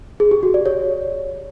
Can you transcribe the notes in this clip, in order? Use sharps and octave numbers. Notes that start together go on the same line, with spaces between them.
G#4
G4
F#4
D5
C#5